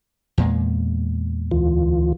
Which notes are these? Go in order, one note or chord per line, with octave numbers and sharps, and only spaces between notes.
E2 A#2 G#3
D2 E3 F4